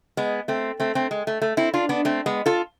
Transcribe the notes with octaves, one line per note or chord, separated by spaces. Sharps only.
G#3 B3
A3 C4
A3 C4
A3 C4
G#3
A3
A3
C4 E4
D4 F4
B3 D4
A3 C4
G#3 B3
F4 A4